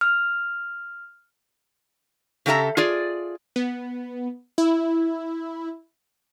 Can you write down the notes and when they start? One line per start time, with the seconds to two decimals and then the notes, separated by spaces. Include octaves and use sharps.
0.01 F6
2.46 C#3 G4 A4 E5 A#5
2.77 F4 G#4 D5
3.56 B3
4.58 E4